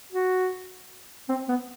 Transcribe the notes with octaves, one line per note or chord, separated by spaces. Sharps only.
F#4
C4
B3